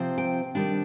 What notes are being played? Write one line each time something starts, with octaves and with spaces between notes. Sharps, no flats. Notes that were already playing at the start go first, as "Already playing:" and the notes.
Already playing: C3 F3 C4
G5
D#3 G3 D4